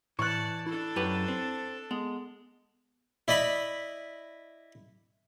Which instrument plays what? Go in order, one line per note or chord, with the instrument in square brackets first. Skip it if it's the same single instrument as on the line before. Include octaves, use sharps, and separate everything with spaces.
[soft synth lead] A2 [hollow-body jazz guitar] E3 [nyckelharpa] D5 A5 [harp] C#6 F#6
[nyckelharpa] D4 A4 [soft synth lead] E4
[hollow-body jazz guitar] F#2 G4 B4
C4
[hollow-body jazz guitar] G#3 [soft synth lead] B3
[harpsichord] E4 D5 D#5 B5